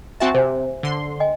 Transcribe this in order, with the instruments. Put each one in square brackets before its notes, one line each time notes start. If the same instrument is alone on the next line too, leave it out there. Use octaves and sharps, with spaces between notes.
[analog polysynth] C4 F#4 A5 [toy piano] E5 G#5
[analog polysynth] C3 [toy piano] C5 G#5
[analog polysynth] D3 C6
[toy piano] D#5 G5 G#5